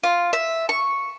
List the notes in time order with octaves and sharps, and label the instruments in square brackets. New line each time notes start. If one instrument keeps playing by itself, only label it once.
[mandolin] F4
E5
C#6